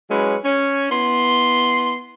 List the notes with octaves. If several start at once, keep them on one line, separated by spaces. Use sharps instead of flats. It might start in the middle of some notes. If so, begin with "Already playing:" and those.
F#3 G#3 C#4 E4 B4
C#4
B3 E4 C6